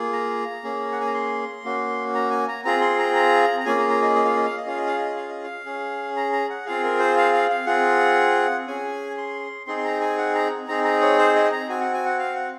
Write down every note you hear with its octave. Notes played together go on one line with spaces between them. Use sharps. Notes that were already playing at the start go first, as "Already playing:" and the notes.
Already playing: A#3 F4 G#4
A#5
A#3 C#4 G#4
F#5
G#5
A#5
C6
A#3 C#4 F#4
A#5
G#5
A#5
C4 F4 G#4 A#5
C6
A#5
A#5
A#5
A#3 C#4 F4 G#4 G#5
A#5
A#5
D#5
D#5
F5
D#5
F5
D#5
C#4 F4 G#4 F5
D#5
F5
D#5
F5
D#5
F5
C#4 G#4
A#5
A#5
F#5
C4 F4 G#4 F5
A#4
C5
F5
F5
F5
C4 F4 G#4 F#5
C#4 G#4 G#5
C6
C4 D#4 G#4 C6
C6
A#5
G#5
F#5
A#5
C4 D#4 G#4 A#5
A#5
C#5
C5
D#5
A#5
C4 F#4 G#5
F#5
G#5
F#5
F5
F#5